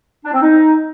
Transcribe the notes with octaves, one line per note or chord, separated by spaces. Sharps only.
D4
C4
D#4